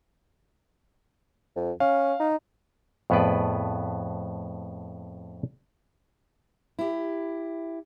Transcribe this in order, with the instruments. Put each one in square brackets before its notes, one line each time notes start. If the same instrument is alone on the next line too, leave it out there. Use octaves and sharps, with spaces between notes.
[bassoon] F2
[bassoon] C#4 [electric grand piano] F5
[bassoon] D#4
[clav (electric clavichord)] F2 A2 B3 G#4 B4 D5
[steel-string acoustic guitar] E4 G4